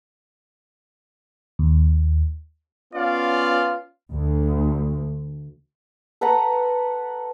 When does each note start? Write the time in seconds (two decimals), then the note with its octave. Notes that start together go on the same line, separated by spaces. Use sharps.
1.59 D#2
2.94 B3 C#4 F4 D5 F5
4.13 D2
6.21 A4 B4 F#5 A#5